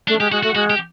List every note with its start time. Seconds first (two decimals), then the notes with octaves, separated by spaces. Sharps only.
0.08 A3 D4
0.20 G#3 G4
0.32 G#3 F#4
0.43 A3 F#4
0.54 G#3 F#4
0.70 G4